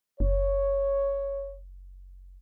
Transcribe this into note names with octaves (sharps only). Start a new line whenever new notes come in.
F#1 C#5